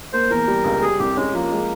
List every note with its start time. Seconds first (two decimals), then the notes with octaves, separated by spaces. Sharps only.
0.13 A#3 C5
0.30 E2 A#4
0.47 G3
0.64 C#2
0.82 G3 G#4
0.99 C2 G4
1.16 G#3 C#4
1.33 F3 A#3
1.51 G#3